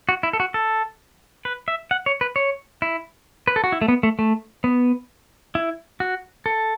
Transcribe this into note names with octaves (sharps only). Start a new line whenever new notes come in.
F#4
E4
A4
F#4
A4
B4
E5
F#5
C#5
B4
C#5
E4
B4
A4
F#4
E4
A3
B3
A3
A3
B3
E4
F#4
A4